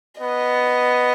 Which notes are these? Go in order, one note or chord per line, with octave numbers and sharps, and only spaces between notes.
B3 D#5